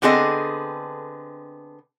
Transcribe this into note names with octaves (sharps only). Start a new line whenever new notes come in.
D3 B3 C4 G#4 A4 D#5